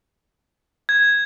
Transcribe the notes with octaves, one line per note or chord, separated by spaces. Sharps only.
G#6